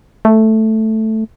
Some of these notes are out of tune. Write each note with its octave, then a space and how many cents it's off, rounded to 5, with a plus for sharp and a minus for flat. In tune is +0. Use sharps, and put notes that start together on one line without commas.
A3 +0